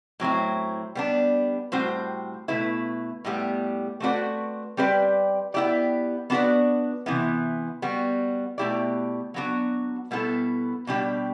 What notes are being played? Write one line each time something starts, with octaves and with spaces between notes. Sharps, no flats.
A2 F#3 C4 E4
G3 B3 D4
A2 G3 C4 F#4 C5
B2 A3 E4 B4
A2 G3 B3 E4 G4
A3 C4 F#4 B4 D5
G3 C4 G4 B4 D5
B3 E4 G4 D5
B3 D4 F#4 B4 D5
C3 E3 B3 E4
G3 B3 F#4
B2 A3 E4 G4 D5
F#3 B3 D4 F#4
B2 G3 B3 E4 A4
B2 G3 D4 G4